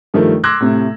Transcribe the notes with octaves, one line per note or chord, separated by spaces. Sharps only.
G2 D#3 F3 A3
C6 D6 E6 F#6 G#6 A#6
A2 C3